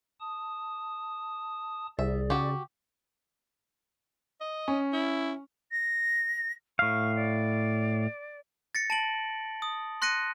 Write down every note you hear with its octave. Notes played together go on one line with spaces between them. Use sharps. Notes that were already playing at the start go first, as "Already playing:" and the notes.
A5 D#6
C2 G#4 D5 E5
C#3 F#4 G4
D#5
C#4
E4
A#6
A2 F5 C#6
D5
A6 A#6 C#7
A5 D7 F#7
D#6
C6 F#6 A#6 C#7 D#7